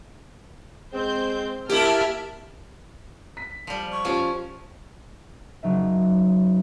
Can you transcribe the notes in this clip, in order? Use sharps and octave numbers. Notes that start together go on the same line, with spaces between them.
G#3 C4 C5 G6
A#3 E4 G4 E5 A5 F6
B6
F3 G3
C#6
F3 C#4 F4 G4 C5
F#1 F#3 D#4 E5